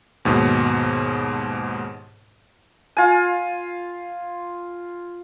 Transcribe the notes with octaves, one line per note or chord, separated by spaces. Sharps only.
D#2 G#2 B2
F4 G#5